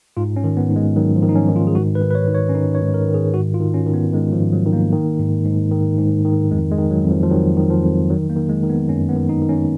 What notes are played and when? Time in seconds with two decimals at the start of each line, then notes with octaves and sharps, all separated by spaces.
0.17 G#2 F4
0.36 C#4
0.44 D#3
0.57 B3
0.70 G#2
0.76 G#3
0.96 D#3 F#3
1.16 F3
1.23 D#3
1.29 D#4
1.36 C#4
1.49 D#3
1.56 F4
1.67 G#4
1.75 G#2 F#4
1.95 B4
2.02 D#3
2.11 B4
2.15 C#5
2.28 D#3
2.35 C#5
2.49 C#4
2.54 D#3 D#4
2.75 C#5
2.82 G#2
2.94 A#4
3.08 D#3
3.14 G#4
3.34 G#2 F#4
3.54 F4
3.60 D#3
3.74 C#4
3.87 D#3
3.94 B3
4.13 D#3 G#3
4.33 F3
4.39 G#2
4.53 F#3
4.66 D#3
4.73 A#3
4.92 D#3
5.19 G#2
5.46 G#2
5.72 D#3
5.98 G#2
6.25 D#3
6.51 F2 G#3
6.71 G#3
6.78 D#3
6.91 F#3
7.04 F2
7.11 F3
7.23 F3
7.30 D#3 F#3
7.57 D#3
7.70 F3
7.83 F2
8.10 D#3 F#3
8.30 A#3
8.36 D#3
8.49 G#3
8.63 D#3
8.70 B3
8.89 F#2 C#4
9.09 B3
9.16 D#3
9.29 D#4
9.42 D#3
9.49 C#4